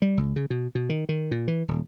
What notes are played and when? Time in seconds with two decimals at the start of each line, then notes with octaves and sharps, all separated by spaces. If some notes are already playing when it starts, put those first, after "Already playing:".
0.02 G3
0.17 C#2
0.36 C#3
0.50 B2
0.75 B2
0.89 D#3
1.09 D#3
1.31 A#2
1.48 E3
1.68 D#1